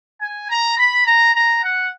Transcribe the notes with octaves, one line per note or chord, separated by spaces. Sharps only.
G#5
A#5
B5
A#5
A#5
F#5